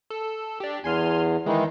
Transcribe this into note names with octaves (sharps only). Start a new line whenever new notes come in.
A4
D4 G4
E2 G#5 C6 F6
D#3 E3 G#3 D#4